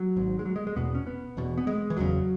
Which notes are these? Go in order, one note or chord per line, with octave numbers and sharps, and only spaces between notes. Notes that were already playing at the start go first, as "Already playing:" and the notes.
Already playing: F#3
G#1 G#2
G#3
F#3
G#3
G#3
E1 E2 B2 B3
C#4
B3
E1 E2 B2
B3
G#3
E3
F#1 E2 C#3 F#3